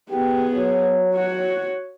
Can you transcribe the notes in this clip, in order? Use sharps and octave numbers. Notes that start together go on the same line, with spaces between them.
B3 G4 G#4
F#3
F#4 C#5